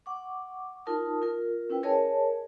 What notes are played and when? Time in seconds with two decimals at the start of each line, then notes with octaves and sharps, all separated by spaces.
0.06 F#5 C#6 D6
0.86 D#4 F4 A#4 A5 D#6
1.22 F4 A#4
1.70 C#4 E4 B4 G5
1.83 G#4 A#4 C#5 D#5 G#5 A5